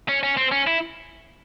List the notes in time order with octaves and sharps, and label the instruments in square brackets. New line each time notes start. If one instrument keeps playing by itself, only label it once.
[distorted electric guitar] C#4
C#4
C4
C#4
E4